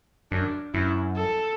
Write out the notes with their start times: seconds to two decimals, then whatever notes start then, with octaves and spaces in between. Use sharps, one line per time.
0.31 F#2 D4
0.74 F#2 E4
1.16 A4